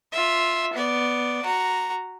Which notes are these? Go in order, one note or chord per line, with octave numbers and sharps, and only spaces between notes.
F4 E5
B3 D5
F#4 A#5